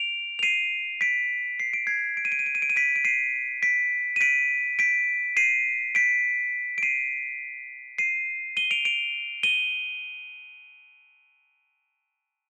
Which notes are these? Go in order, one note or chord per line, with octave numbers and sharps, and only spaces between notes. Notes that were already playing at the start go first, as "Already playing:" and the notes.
Already playing: D7 F7
F7
C7 D#7
B6 D7
C7
D7
G#6 C7
D7
D#7
D7
D#7
D7
D#7
D7
D#7
B6 D7
D7
C7 D#7
B6 D7
D#7
B6 D7
B6 D7
C7 D#7
B6 D7
D7
C7 D#7
C7 D#7
D#7 G7
D7 F7
D7 F7
D#7 G7